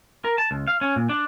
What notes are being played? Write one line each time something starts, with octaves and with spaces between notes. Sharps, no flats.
A#4
A5
C#2
F5
C#4
A#2
D4